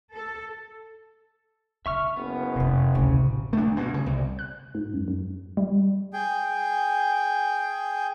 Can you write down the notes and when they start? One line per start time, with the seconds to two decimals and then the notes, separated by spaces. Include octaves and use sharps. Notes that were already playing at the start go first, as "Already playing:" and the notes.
0.14 A4
1.86 C#3 E5 C#6 F6
2.16 F#1 B3
2.56 F1 C3 D4
2.95 A1 D2 C#3
3.53 A3 D4
3.77 G2 B2
3.94 C#3
4.06 C2
4.39 F#6
4.75 G#2
4.94 F#2
5.08 F#2
5.57 G3
6.13 G#4 G5